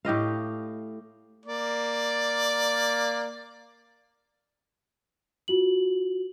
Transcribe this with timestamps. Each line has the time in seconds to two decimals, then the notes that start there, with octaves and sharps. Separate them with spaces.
0.05 A2 G4 D#5 F5
1.46 A#3 D5
5.48 F4 F#4 F#7